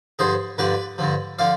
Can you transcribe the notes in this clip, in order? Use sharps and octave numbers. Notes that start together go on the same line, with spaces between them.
G2 D3 F3 G#4 C5
G2 D3 F3 B4 D5
G2 D3 F3
D3 F3 D5 F5